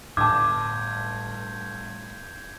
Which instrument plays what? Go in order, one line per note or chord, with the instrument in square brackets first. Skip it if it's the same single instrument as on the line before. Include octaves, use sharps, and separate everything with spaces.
[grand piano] G1 A5 [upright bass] A2 [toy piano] D6 [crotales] G6 G#6